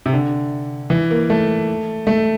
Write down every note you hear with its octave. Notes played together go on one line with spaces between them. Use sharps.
C3
D3
E3
A#3
A3
A3